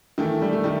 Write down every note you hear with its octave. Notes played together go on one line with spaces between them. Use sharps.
D#3 E3 A3 E4
G3
A3
D#3 G3